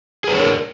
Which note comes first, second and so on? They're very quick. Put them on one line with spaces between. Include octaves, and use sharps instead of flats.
G#4 B4 D4 C#5 A#4